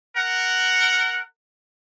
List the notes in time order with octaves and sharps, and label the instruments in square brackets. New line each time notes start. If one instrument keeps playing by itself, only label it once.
[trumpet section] A#4 F#5